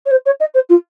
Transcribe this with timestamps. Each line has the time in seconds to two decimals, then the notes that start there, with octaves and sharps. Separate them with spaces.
0.05 C#5
0.11 C5
0.25 C#5
0.40 D#5
0.54 C5
0.69 F4